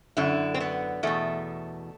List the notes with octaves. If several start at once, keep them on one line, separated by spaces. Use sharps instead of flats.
F#2 D3 E4
C4
B3
E2 B2 A3